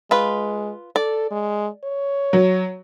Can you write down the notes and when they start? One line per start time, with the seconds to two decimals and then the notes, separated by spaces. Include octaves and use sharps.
0.11 G#3 F4 B4
0.96 A4 D5
1.31 G#3
1.84 C#5
2.33 F#3